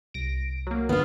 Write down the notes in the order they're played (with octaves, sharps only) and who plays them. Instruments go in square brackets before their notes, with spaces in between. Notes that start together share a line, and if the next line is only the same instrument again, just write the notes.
[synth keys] C2 A#6 [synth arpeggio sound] D7
[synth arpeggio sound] F#3 A#3
[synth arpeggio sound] G1 A2 [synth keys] D3 E3 F5 [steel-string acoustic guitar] B3 F4